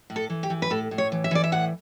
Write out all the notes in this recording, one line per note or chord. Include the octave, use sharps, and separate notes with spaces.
A2
A4
E3
G4
E3
B4
A2 A4
A2
C#5
E3
E5
E3 D5
E5
A2 F#5